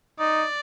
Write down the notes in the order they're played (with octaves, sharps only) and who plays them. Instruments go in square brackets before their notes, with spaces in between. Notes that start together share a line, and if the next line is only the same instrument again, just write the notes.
[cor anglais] D#4 [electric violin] D5